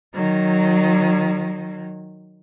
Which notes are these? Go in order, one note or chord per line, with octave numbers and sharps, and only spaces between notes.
D#3 F#3